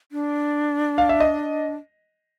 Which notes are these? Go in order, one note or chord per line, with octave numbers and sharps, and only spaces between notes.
D4
F5
E5
D#5